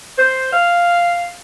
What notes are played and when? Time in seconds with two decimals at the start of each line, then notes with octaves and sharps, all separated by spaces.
0.18 C5
0.53 F5